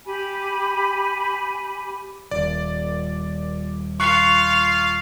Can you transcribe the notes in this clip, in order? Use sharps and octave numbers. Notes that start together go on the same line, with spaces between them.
G4 G#5 B5
D#1 D5
F4 F5 C#6 F#6 C7